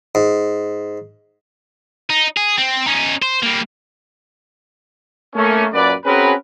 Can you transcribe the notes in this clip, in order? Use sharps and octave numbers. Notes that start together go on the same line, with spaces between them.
G#2
D#4
G#4
C4
C#4 D#4
C5
G3 A#3
A3 A#3 C#4
F#2 A#2 B4 D5
C4 C#4 F#4 G#4 A#4 B4